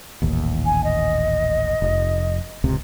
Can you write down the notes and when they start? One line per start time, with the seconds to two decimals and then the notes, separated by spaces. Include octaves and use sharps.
0.22 D#1 A1 D#2
0.65 G#5
0.84 D#5
1.82 F1
2.64 D1 C#2 C3